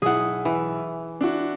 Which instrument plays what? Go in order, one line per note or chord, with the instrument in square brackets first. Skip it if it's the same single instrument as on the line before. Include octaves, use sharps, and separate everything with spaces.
[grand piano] B1 E4 [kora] G#4 F#5
[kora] E3
[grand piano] D4 E4 F#4